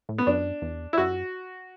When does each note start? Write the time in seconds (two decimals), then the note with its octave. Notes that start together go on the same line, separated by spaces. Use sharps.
0.09 A2
0.18 B3
0.27 F#2 D4
0.62 E2
0.93 E4
0.98 F#2 F#4